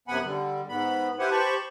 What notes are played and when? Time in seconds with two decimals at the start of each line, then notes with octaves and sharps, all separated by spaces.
0.08 F#2 C3 B3 F#5 G#5 B5
0.24 D3 G3
0.69 G#2 B3 B5
1.19 E4 G4 B4 C5 F#5 G#5
1.31 G4 C5 A5 B5 C#6